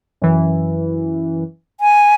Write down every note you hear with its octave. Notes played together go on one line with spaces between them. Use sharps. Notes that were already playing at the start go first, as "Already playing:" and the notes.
F#2 E3
G#5